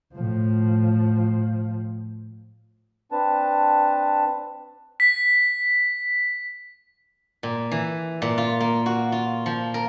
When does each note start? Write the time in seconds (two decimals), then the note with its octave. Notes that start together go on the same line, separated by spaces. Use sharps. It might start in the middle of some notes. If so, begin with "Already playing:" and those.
0.14 A2 F3
3.12 C4 D4 B4 A5
5.00 B6
7.43 A#2
7.71 E3
8.22 A#2
8.38 F4
8.60 A#3
8.86 F#4
9.12 F4
9.46 F3
9.74 A#4